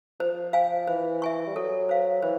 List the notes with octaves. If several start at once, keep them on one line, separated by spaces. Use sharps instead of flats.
F3 C5
F5 G#5
E3 C5
E5 G#5 C#6
G3
F#3 A4
C5 F5
E3 C5